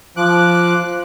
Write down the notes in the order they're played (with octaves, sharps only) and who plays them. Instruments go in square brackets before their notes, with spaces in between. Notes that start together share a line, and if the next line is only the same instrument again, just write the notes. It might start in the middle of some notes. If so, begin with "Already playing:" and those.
[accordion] F3 D6 F#6